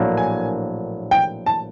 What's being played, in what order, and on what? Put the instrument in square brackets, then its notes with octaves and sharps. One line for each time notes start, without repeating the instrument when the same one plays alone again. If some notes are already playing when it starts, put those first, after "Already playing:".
Already playing: [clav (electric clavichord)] A#1 A2 F#3 A#3 D4
[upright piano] G#5
G5
A5